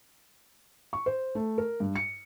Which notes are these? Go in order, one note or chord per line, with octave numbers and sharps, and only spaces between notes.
C#6
C5
A3
A#4
G2
C#7